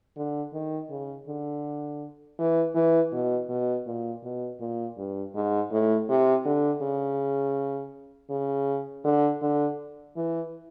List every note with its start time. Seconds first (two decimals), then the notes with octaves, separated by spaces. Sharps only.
0.17 D3
0.53 D#3
0.90 C#3
1.28 D3
2.39 E3
2.75 E3
3.13 B2
3.49 B2
3.86 A#2
4.24 B2
4.60 A#2
4.97 G2
5.35 G#2
5.72 A2
6.09 C3
6.45 D3
6.82 C#3
8.30 C#3
9.05 D3
9.42 D3
10.16 E3